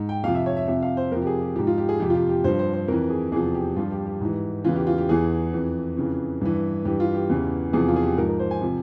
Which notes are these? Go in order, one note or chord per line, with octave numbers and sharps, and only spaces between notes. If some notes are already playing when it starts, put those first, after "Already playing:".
Already playing: G#2
G5
F2 C3 F3 F5
E5
C#5
E5
F2 C3 F3 E5
F5
C5
F2 C3 F3 A#4
G4
G#4
G4
G#2 F3 G4
F4
G4
G#4
F2 C3 F3 G4
F4
G4
G4
G2 F3 C5
C5
C5
F2 E3 A#4
G#4
E2 C3 F3 G#4
G4
G2 F3 F4
G4
G4
G#2 E3
E2 C#3 E3 F4
G4
F4
G4
E2 E3 G#4
F2 E3
F2 C#3 E3
G2 E3
G2 E3 G4
F4
G4
E2 C#3 E3
E2 C3 F3 G#4
F4
G#4
G4
G#2 F3 A#4
A#4
C5
G#5
C3 F3